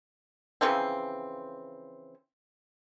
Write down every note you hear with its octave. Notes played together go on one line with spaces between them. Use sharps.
C#3 E3 F3 C4